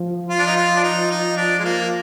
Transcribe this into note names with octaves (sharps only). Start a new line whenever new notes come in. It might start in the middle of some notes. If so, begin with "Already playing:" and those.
Already playing: F3
F4
D4
D#4
F4
D4
D#4
D#4
D4
G#3
A#3